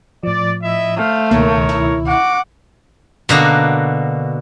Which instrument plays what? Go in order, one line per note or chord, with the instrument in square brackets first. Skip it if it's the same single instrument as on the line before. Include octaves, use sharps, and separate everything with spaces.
[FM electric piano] A2 F3 [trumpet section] D5
[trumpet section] E4 D#5 E5
[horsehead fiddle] A3 [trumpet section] C5 F5
[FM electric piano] C#2 B2 D#3 [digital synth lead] A#3 [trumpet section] A#4 C#5
[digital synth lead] E4
[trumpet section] F#4 D6 [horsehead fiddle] F#5
[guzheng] B2 D3 A#3 F#4